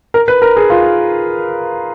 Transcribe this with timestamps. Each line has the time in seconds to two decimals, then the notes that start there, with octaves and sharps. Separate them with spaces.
0.14 A#4
0.28 B4
0.42 A#4
0.57 G#4
0.70 F4